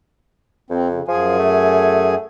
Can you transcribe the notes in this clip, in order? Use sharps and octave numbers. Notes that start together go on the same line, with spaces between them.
F2 C4
C#3
F#2 F3 G#4 G#5
A3